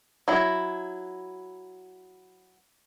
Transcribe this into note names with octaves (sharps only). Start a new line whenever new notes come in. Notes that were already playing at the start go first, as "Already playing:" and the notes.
F#3 E4